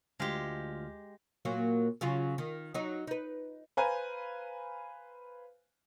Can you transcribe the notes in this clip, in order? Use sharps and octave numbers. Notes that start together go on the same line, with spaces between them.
D2 G#3 F4 G4 F6
A#2 F#3 A#3
C#3 F#3 F4
D#3
F#3 D#4
D#4 B4
B4 C5 F5 G#5 A#5